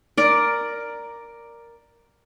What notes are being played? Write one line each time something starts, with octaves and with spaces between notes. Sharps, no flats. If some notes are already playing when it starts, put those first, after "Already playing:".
A#4 D5